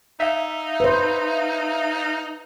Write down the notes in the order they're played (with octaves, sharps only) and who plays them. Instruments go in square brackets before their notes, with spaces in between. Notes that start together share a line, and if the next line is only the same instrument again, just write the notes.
[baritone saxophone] D#4 [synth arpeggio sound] E5 F5
[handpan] B4 C5